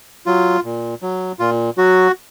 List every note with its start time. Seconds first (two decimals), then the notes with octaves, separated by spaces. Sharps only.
0.26 F#3 F4
0.64 A#2
1.02 F#3
1.39 A#2 F4
1.77 F#3 F#4